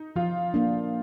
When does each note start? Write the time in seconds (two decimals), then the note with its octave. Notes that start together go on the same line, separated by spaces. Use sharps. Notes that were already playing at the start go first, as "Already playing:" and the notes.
Already playing: D#4
0.16 F3 F4
0.54 A#3 D4